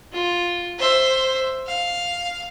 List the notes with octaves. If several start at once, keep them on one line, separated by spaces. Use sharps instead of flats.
F4
C5 E5
F5